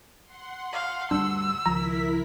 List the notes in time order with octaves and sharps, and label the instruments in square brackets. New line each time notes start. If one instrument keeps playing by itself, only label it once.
[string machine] F#5 C6
[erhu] F5
[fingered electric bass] D2 G2 [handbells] D4 [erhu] E6
[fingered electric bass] C#2 D#3 F3 [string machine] E4 A#4 B6 [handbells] A#5